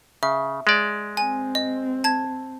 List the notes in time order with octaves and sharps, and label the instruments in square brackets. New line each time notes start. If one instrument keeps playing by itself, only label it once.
[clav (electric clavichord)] C#3 [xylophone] E5
[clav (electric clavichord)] G#3 D5
[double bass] C4 [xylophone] G#5
[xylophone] D#5
A5 G#6